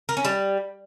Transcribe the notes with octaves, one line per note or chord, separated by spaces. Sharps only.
A#4
C#4
G3